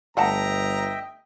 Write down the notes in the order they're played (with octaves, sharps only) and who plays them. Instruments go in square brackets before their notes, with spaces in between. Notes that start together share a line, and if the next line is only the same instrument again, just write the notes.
[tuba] G1 [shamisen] A3 F#5 A5 [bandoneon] D#5 E5 G5 [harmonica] A#5